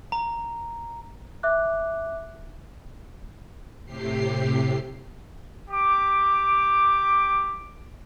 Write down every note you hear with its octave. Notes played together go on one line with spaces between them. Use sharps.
A#5
E5 D6 F#6
A2 C3 G4 C7
G4 D6